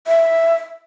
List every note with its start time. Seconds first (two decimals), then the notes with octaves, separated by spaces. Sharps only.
0.07 E5